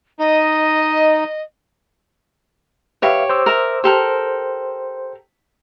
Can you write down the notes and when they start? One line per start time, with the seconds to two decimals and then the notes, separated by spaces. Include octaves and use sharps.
0.19 D#4 D#5
3.02 G4 B4 C#5 E5 F5
3.30 C5 D6 E6
3.46 A#4 E5
3.84 G4 A4 A#4 C5